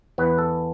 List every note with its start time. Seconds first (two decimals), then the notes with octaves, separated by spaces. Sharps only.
0.18 E2 E3 B3 B4
0.38 A4